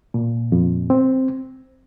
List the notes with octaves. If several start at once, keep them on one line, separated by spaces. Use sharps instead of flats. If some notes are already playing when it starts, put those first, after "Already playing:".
A#2
F2
C4